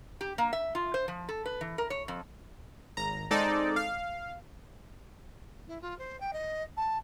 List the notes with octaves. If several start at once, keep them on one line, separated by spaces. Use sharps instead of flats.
G4
A#3
E5
F4
C5
F3
A4
B4
E3
A#4
C#5
F2
G#1 A#5
G#3 C4 D#4 A4 D5
F5
E4
F4
C5
G5
D#5
A5